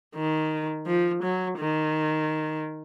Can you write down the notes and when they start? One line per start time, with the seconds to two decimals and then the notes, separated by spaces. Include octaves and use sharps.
0.16 D#3
0.87 F3
1.23 F#3
1.58 D#3